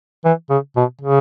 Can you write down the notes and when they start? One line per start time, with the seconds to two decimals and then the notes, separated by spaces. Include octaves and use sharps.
0.25 E3
0.50 C#3
0.76 B2
1.01 C#3